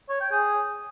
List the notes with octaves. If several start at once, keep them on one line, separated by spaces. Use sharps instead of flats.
C#5
G5
G#4